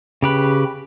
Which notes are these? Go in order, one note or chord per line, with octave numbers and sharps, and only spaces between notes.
C#3 G4 B4